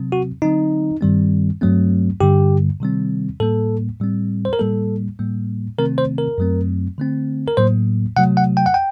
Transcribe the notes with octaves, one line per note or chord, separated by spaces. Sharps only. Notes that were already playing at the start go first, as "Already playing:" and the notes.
Already playing: C3 F#3 C4
F#4
D3 F#3 C4 D#4
G2 D#3 G3 C4
G2 F#3 A3 C4
G2 D3 G3 G4
C3 D#3 G3 C4
A2 G3 A#3 A4
A2 G3 C4
C5
A#4
A2 G3 A#3 A4
A2 G3 A#3
C3 D#3 A3 C4 A#4
C5
A#4
F#2 F#3 A3 C4
D3 A3 C4
A#4
A2 F#3 A#3 C5
C3 F#3 A3 F#5
F#5
G5
F#5
G5